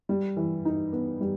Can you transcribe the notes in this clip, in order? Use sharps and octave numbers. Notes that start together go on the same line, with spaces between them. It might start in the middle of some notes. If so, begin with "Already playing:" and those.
G3
E3
D#4
B3
G3